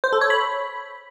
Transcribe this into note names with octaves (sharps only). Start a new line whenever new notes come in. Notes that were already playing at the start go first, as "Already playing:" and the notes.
C5
A4
C#5
B5